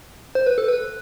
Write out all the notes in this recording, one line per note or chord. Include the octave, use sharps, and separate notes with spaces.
C5
B4
A4
B4